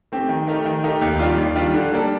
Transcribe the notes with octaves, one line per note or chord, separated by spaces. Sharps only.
A3 C4 G4
D#3
A3 D#4 G4 A#4
D#3
A3 D#4 G4 A#4
D#2
D#3 G3 D4 F4
D#2
D#3 G3 D4 F4
D3
G3 A#3 D4 A4